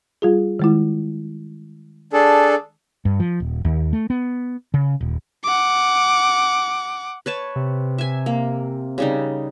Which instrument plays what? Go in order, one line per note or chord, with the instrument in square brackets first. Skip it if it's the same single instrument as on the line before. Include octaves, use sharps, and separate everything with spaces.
[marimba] G3 F4 G#4
D#3 G#3 E4
[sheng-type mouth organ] D4 G#4 A4
[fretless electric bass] G2
F3
D#1
D#2
A3
B3
C#3
D#1
[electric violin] F#5 D6
[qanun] B4 C#5 A5
[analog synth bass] C3
[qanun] E5 G#5
A#3
C#3 G3 D#4